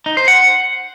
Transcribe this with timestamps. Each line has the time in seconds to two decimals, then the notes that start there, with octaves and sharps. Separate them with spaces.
0.06 D#4
0.17 C5
0.28 F#5